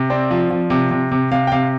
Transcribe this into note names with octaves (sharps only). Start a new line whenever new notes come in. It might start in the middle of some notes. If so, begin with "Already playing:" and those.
Already playing: C3
C4 D5
F3
F3
C3
C3
C3
C3 F5
G5
C3 F5